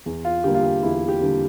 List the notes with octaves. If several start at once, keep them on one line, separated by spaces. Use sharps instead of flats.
E2
F4
D3 G3 A#3 G4
F4
G4
E2 E4
G4
D3 G3 A#3